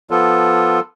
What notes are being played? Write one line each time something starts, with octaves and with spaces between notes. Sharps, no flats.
F3 B3 F4 A4